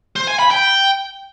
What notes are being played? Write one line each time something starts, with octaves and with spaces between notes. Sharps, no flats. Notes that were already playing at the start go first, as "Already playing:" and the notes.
C5
G#5
B5
G5